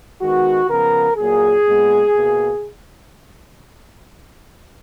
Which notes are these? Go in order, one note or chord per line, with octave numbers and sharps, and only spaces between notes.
D#3 G#3 B3 F#4
C#3 F3 B3 A#4
A#2 F#3 A#3 G#4
A#2 G#3 B3
B2 A#3